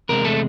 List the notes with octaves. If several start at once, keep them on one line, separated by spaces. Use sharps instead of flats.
E2 C3 G#3 A#4
A3 A4